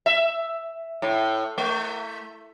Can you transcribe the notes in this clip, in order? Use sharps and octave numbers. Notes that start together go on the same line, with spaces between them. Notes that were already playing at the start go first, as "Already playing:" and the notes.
E5
A2
A3